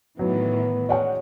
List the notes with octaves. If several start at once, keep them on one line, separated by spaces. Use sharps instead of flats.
A2 D#3 E3 F#3 B3
F#3 G#3 C#4 D5 F#5 G5